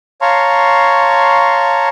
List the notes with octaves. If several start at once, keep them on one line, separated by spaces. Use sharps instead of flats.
C#5 F5 A5 A#5 C6 C#6